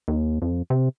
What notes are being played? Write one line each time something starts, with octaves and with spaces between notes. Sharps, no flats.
D#2
F2
C3